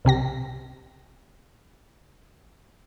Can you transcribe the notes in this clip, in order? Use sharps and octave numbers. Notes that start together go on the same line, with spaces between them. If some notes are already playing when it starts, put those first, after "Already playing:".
C2 C3 G4 A#6